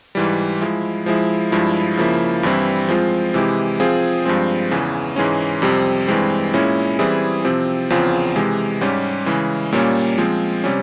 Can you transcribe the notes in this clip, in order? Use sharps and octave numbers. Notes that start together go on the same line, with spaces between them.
G#2 E3 G3
F3 G#3 E4
F3 G#3 E4
G2 F3 G#3 E4
C#3 F3 A#3 E4
G2 E3 G3 C4 E4
F3 G#3 C4 F4
C3 E3 G#3 E4 G4
F3 C4 F4 G#4
G2 F3 G#3 C4
E2 C#3 E3
G#2 E3 G#3 C#4
F2 C3 G3 C4
G2 E3 G#3 C4
A#2 G#3 C#4 E4
E3 G3 C4 E4 G#4
C3 F3 C4
E2 C#3 F3 C4 F4
C3 E3 G#3
G#2 G3 C#4 G4
C#3 E3 G#3
A#2 G3 A#3 C#4
F3 G#3 C4
C3 G3 C#4